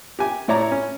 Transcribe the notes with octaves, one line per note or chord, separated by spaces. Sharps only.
G4 G#5
A2 E4 C#5 D5 A#5
C#4